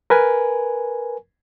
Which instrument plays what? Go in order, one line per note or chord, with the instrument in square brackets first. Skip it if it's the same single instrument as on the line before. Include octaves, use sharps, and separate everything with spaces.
[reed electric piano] A#4 B4 G#5